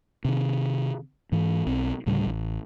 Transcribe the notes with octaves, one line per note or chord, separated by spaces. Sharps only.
C3 D#3
G#2 E3
B1 C4
D2 A2 C#3 G3
A1